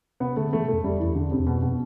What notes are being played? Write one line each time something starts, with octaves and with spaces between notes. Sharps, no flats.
C3 B3
D3 A3
E3 A3
C3
A3
F2
F2 G3
F2
E3
E2
D3
C3
E2
F2 B2
B2